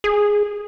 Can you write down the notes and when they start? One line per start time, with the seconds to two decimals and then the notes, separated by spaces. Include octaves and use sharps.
0.04 G#4